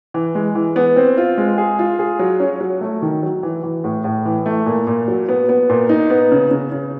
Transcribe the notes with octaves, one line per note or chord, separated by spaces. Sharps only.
E3
G#3
E3
B3
C4
F4
G#3
G#4
F4
G#4
F#3
C#4
F#3
A3
D#3
F#3
E3
E3
A2
A2
E3
A3
A#2
A#2
F#3
B3
B3
A#2
D#4
B3
C#3
C#3
C#3